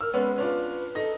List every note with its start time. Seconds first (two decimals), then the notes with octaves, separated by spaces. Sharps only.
0.01 A#4 E6 F6
0.14 G#3 B3 C#4 B4
0.38 C#4 D4 F4 B4
0.95 D#4 A4 A#6